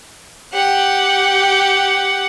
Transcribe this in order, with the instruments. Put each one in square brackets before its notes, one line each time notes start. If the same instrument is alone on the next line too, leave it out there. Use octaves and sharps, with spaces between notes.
[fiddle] G4 F#5